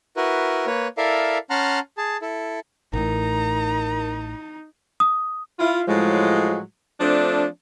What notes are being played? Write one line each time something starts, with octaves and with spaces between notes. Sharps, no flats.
E4 F#4 A#4 B4
A#3 B4 C#5
E4 A4 A#4 D5 E5 F5
C#4 F#5 A5 A#5 C6 F6
G#4 A5
E4 A4
A1 A2 D#4 A#4 A#5
D#6
E4 F4
A2 F3 F#3 G#3
F3 A3 C4 D4